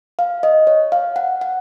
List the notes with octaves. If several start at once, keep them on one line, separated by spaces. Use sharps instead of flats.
F5
D#5
C#5
F5
F#5
F#5